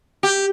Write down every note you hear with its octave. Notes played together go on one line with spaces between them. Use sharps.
G4